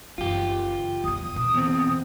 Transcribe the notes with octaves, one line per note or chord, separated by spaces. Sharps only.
F#1 E3 F4 G4
E2 G2 D#6
B2
E2 C4